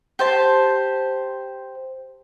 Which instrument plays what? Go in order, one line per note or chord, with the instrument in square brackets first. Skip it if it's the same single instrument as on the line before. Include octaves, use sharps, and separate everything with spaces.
[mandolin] G4 C5 A5